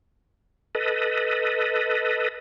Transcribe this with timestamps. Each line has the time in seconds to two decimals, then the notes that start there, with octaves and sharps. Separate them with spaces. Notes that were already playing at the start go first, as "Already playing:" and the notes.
0.75 A4 B4 D#5